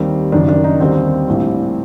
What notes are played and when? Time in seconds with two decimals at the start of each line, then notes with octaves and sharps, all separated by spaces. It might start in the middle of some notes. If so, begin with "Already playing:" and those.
Already playing: D#2 D#3 G3 C4
0.32 F#1 F#2 D#3 D4
0.49 D4
0.64 D#4
0.80 D#2 D3 G3 C4
1.28 A#1 A2 G3